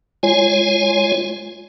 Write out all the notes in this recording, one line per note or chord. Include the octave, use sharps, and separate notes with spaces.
G#3 F4 C#5 G#5